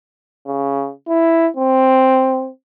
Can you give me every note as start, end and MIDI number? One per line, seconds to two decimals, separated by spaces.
0.47 0.91 49
1.08 1.48 64
1.57 2.49 60